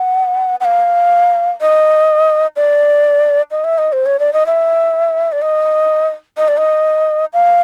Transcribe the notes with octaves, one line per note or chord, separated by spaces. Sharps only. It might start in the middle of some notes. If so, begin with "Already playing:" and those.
Already playing: F#5
F#5
F5
D#5
D5
D#5
E5
D#5
C5
C#5
D5
D#5
E5
D5
D#5
D#5
D5
D#5
F5